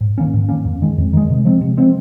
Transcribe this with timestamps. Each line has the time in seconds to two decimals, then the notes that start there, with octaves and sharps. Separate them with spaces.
0.01 G#2
0.18 D#3 A#3 C#4
0.34 G#2
0.49 D#3 A#3 C#4
0.65 F2
0.82 D#3 G#3
0.98 F2
1.13 D#3 G#3
1.30 C3
1.45 F3 G#3 C4
1.61 C3
1.77 F3 G#3 C4